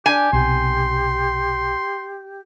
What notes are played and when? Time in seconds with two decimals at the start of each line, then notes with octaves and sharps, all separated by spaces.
0.06 D4 G4 G#5
0.33 B1 C3 G4 C6